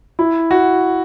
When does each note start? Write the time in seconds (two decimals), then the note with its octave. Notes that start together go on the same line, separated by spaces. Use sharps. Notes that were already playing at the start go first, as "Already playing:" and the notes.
0.19 E4
0.51 F#4